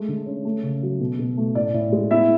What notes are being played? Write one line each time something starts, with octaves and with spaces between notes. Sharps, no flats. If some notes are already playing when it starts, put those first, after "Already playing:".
Already playing: G#3 A3
D3
C#4
A3
C#3
F#3
B2
B2
A3
A2 D5
A2
G#3
B3 E4 E5